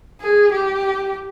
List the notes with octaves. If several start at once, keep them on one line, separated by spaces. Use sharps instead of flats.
G#4
G4